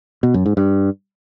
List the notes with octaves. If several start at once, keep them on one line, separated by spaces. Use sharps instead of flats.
B2
F#2
G#2
G2